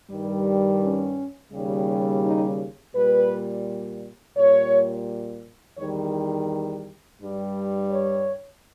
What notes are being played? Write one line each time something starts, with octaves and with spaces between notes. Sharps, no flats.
G2 D#3 G3
C#4
D#2 C#3 G3
D#4
A#2 G3 B4
A#2 G3 C#5
E2 D#3 G3 C#5
G2 G3
C#5